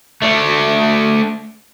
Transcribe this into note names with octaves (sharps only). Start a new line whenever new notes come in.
A3 D4